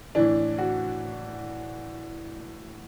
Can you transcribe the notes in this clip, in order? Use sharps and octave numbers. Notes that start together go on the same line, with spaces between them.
A2 E3 D4
F#4